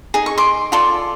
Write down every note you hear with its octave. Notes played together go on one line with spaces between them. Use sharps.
D#4 G#4
C#6
C6 D6
F4 A4 D5 C6 D6